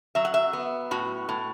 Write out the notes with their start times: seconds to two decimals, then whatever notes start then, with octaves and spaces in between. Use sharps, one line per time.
0.15 F#3 E5
0.25 F#5
0.34 E5
0.53 B3
0.91 A2 F#4
1.29 A2